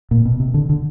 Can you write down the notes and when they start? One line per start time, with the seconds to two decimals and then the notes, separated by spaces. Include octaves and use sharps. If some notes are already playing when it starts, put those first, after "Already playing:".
0.11 A#2
0.25 B2
0.40 C3
0.54 D3
0.69 D3